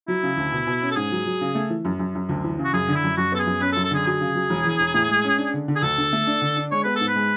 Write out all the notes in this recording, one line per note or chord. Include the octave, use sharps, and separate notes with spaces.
F#3 E4
C#3
D2
B2
B2
C#4
A4
G#2 G#4
F#3
F#3
C#3
A3
E3
F#2
F#2
F#2
D2
E3
C#3
F#4
F#2 G#4
D3
E4
F#2
F#2 F#4
B3 A4
G#4
F#2
C#4 B4
A4
F#2
A4
D3 G#4
F#3 G#4
C#3
F#3
E1
E2
E1
A2
G#3
C#4
D4
D3
D3
G#4
D2 A4
D3
A3
D4
D3
D4
G#3 C#5
B3 B4
G#2 A4
B4
G#3